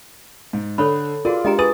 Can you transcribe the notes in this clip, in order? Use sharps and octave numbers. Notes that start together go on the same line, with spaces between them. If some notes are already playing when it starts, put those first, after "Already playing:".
G#2
D3 A4 C#5 B5
F4 F#4 G#4 A#4 D5
G#3 D4 G4 D#5 G5 A#5
G#4 B4 G#5 D#6 A6